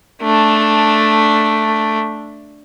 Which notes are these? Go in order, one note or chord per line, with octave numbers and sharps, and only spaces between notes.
A3 D4